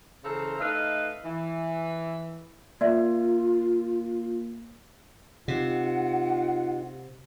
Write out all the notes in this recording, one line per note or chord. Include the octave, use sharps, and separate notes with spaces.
C#3 E3 A4 C5 F5 A#5
A3 D#4 A4 B4 D#5 F5
E3
A#3 F4 D5 E5
C3 D#4 F4 G4 F#5